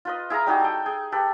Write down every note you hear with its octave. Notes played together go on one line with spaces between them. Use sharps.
F4 B4 D#5
E4 G#4 F5 A#5
G3 D#4 F#4 G#4
A4 G5
G#4
G4 A4 B4